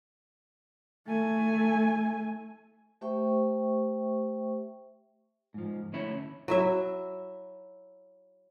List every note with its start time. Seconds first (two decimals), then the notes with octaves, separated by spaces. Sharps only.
1.08 A3 G#5
3.01 A3 G4 C5 E5 G5 C#6
5.54 G#2 F3
5.93 D2 C#4 E4 C#5 E5 B5
6.48 F#3 E4 E5